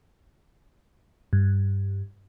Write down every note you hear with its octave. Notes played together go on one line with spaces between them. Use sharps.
G2